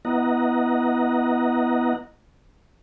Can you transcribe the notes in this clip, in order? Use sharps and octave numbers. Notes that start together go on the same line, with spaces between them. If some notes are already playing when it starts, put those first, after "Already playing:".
B3 E4 D#5 F#5 A#5